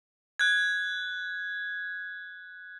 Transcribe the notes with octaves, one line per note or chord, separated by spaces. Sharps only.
F#6 G#6